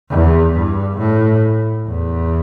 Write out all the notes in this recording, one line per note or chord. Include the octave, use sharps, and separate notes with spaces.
E2
G2
A2
E2